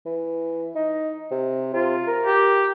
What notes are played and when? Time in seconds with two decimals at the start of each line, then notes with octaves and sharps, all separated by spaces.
0.06 E3
0.75 D#4
1.31 C3
1.73 C3 F4
2.07 A#4
2.23 G4